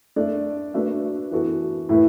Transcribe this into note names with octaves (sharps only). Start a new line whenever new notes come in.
A3 D4 A4 D5
A3 D4 F#4 B4 E5
E3 B3 F#4 A4
A2 A3 E4 B4